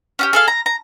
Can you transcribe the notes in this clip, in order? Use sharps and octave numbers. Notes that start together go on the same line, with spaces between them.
C#4 F#4 G4
G#4 A4 F5
A#5
A#5